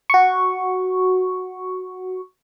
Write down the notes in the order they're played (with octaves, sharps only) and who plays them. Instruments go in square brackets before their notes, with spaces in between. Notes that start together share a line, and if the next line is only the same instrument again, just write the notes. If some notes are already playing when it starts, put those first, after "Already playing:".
[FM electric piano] F#4 C#6